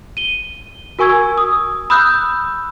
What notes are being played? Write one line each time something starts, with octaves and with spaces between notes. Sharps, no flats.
D#7 G7
F#4 A#4 G#5 C#6 E6 G#6
D#6
B5 D#6 E6 F#6 G6